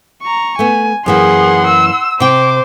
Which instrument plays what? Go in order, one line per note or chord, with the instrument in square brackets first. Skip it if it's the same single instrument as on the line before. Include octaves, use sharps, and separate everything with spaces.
[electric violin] A#5 C#6
[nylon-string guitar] A3 B3 [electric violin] G#5
[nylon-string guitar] F#2 E3 A#3 [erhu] G#4 [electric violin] F#5 C6
[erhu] E6
[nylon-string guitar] C3 G5 [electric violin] C5 [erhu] D6